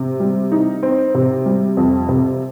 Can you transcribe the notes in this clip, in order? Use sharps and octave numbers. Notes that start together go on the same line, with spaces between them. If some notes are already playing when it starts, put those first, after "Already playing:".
Already playing: C3
G3
D#4
C4
C3
G3
F2
C3